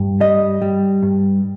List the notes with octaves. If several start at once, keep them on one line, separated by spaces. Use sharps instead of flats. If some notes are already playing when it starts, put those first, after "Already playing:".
Already playing: G2
G3 D#5
G3
G2